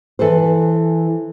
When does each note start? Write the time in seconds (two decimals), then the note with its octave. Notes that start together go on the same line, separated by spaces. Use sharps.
0.19 E3 A4 B4 C5